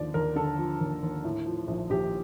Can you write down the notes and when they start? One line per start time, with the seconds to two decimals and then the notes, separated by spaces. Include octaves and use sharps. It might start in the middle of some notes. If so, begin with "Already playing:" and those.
Already playing: D#2 D3 F3 D5
0.14 D#2 A#4
0.36 D3 A4
0.58 F3
0.81 D#2
1.02 D#2
1.24 A2
1.46 F3
1.68 A#1
1.90 A#1 G4